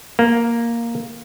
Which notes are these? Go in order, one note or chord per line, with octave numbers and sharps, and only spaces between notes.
A#3